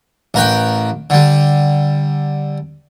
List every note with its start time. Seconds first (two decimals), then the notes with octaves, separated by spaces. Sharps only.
0.34 A1 A#4 B4 G5
1.10 D3 G3